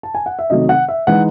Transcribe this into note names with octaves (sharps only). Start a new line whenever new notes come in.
A5
G#5
F#5
E5
C3 D#3 F#3 A3 D#5
F#5
E5
E3 G#3 D#4 F#5